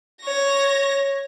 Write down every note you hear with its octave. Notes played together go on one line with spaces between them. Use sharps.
C#5 A#6